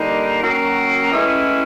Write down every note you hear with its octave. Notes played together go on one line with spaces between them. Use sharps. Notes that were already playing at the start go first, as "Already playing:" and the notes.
Already playing: D3 G3 A#3 D#4
D#3 F#3 A#3 C#4 F#4
A2 E3 G#3 C#4 E4